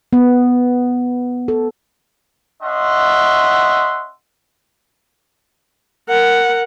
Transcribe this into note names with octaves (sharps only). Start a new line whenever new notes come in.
B3
A4
C#4 D#5 E5 F#5 C6
A#4 F#5